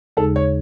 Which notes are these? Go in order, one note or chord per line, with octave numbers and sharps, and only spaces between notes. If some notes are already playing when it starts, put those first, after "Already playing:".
D#2 C#3 G#3 D#4 G#4 A4
C#5